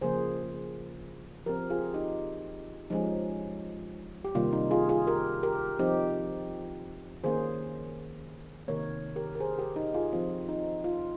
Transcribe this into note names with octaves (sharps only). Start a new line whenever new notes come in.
C#3 F3 A#3 G#4 C5
F3 C4 G4 A#4
F4 G#4
D#4 G4
F3 G#3 C#4 D#4 G4
G4
C3 D#3 G3 A#3 F4
D#4
F4 G#4
F4 G#4
G4 A#4
G4 A#4
F3 C4 D#4 G4
D#3 A#3 C#4 G#4 C5
C3 D#3 A#3 A#4 C#5
G4 A#4
A#4
G#4 C5
G4 A#4
D#4 G4
F4 G#4
F3 C4 F4
D#4
F4